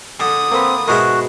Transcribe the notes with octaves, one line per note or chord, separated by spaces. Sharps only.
D3 D#6
A#3 C4 B4
G#2 B2 G#3 F#4 G#4 A#4 E5